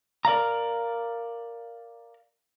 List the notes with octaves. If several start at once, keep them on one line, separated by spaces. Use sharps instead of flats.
A#4 D5 F5 A#5